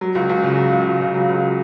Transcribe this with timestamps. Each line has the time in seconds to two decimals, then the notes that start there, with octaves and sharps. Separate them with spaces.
0.01 F#3
0.15 C#2
0.29 C#2
0.43 C#3
0.57 F#3
0.72 C#2
0.87 C#2
1.01 C#3
1.14 F#3
1.29 C#2